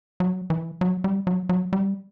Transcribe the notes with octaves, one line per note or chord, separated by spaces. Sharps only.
F#3
E3
F#3
G3
F#3
F#3
G3